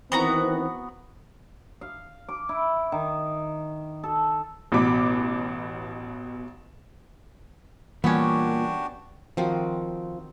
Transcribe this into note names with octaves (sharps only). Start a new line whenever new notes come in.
D#3 E3 B3 C4 F#4 A#5
F5
D6
E4
D#3
A4
A1 B2 B5 D6
A#2 E3 G3 B3 C#4 D4 F#4 G4
D#3 F3 C4 F#4